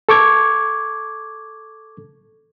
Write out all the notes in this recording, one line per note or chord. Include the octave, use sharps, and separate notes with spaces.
A4 C#6 D6 G#6